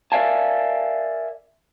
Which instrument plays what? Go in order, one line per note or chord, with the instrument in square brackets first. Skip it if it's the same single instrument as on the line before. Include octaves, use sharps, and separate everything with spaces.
[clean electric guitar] A#4 D5 E5 F5 G#5 A5